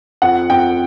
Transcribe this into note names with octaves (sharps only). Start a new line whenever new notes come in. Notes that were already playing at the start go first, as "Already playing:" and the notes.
F2 F#5
F2 G5